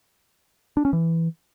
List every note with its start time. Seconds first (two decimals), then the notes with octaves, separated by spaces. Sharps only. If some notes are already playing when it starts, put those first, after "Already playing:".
0.77 D4
0.85 C#4
0.93 E3